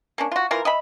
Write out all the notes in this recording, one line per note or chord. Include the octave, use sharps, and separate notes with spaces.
A#3 C#4 D4
F4 F#4
E3 F4 A#4
D#5 E5 B5